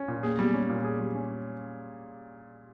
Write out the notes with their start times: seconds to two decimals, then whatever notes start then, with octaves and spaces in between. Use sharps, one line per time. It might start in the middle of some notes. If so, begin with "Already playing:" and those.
Already playing: C#4
0.08 A#2
0.23 A#3 G#4
0.38 G3 B3
0.54 C#4
0.69 A#2
0.84 G#4
1.00 G3
1.15 C#4